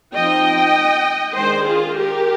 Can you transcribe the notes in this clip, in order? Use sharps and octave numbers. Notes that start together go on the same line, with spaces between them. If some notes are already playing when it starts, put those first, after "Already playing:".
F3 C4 D#4 D#5 G5
D#3 G#3 D4 G#4 C5
F4 G#4
G4 A#4